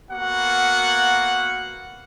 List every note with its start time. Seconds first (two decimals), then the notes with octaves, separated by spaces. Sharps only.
0.12 A#3 B3 F#4 F#5